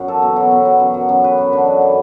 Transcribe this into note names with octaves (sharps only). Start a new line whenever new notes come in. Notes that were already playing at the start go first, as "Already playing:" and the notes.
Already playing: F#2
F#3 A4
B2
F#3
B2
F#3
F#2
F#3
F#2
F#2 B4
F#2
D3
F#3
E3